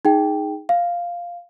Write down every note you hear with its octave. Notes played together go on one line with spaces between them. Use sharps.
D#4 G#4 G5
F5